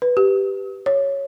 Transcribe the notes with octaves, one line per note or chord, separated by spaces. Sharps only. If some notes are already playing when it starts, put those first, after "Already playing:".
B4
G4
C#5